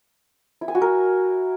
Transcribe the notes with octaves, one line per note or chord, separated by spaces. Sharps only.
E4
G#5
F#4
A#4